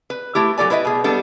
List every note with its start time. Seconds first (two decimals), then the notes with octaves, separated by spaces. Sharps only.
0.10 B4
0.35 A3 E4 G4
0.57 F#3 G4 A4 D5 G#5
0.70 E4 B4 C5 D#5 E5
0.85 B2 G#4
1.04 G3 B3 D4 A4